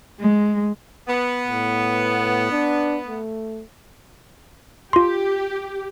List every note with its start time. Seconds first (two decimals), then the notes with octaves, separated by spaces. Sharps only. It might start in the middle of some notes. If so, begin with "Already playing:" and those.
0.19 G#3
1.08 B3
1.47 A2
2.51 D4
3.07 A3
4.93 F4 G4 C6